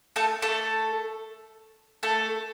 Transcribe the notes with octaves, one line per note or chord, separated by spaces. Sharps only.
A3 A4
A3 A4
A3 A4